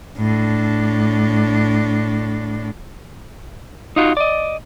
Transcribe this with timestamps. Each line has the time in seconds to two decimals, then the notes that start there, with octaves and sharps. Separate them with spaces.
0.17 A2 D4
3.96 D#4 F4 F#4
4.17 D5 D#5